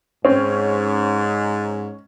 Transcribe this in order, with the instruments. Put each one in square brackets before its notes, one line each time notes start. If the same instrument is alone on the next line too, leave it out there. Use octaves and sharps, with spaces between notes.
[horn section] G#2 [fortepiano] C4 [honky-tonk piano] C#4